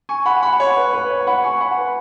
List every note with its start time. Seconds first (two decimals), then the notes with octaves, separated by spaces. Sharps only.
0.09 G#5 C#6
0.26 F#5 B5
0.42 F#5 B5
0.60 C#5
0.76 B4
0.93 B4
1.10 C#5
1.27 F#5 B5
1.44 G#5 C#6
1.60 F#5 B5
1.77 B4